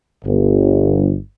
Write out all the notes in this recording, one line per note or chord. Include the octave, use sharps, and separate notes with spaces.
G1